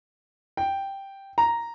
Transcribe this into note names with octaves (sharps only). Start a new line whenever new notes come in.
G5
A#5